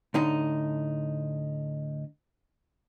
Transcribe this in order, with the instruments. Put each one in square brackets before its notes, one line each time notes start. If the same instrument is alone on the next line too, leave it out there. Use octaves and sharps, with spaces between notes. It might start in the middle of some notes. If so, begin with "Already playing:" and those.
[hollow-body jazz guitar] A2 D3 D#4